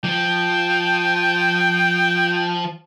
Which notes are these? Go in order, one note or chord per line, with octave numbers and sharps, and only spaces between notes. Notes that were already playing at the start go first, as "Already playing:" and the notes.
F3 G5